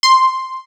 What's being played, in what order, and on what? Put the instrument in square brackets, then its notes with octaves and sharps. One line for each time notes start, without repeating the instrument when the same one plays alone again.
[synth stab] C6